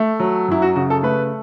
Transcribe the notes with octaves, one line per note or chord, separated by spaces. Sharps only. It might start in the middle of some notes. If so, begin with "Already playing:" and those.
Already playing: A3
F#3
F#2 E4
F#4
C#3 F#4
A4
A3 B4